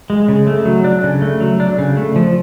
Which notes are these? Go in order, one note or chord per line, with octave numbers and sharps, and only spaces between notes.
G#3
C#3
A3
F#3
D4
C#3
A3
F#3
D4
C#3
A3
F3